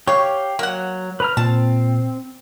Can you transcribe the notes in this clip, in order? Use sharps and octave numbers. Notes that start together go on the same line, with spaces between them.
G4 C#5 F5
F#3 A#3 F#5
B4 A#5 F6
A#2 C4 A5